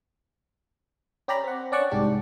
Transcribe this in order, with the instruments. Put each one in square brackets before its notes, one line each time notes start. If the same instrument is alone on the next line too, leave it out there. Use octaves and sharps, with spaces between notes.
[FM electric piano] C#4 G4 D5 A#5 B5
C4 F#5
C#4 D4 D5 F#5 A5 C#6
C2 G#2 D4 G4